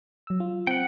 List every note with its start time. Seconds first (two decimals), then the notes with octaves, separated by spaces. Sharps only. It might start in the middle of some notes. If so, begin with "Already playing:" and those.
0.27 F#3 E6
0.40 F4
0.67 C4 F#5 G5